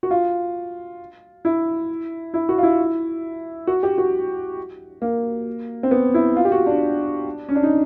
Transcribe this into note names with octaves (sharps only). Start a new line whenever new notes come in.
F#4
F4
E4
E4
F#4
F4
E4
F#4
G4
F#4
A#3
C4
B3
E4
F4
G4
F#4
D4
C#4
D4
D#4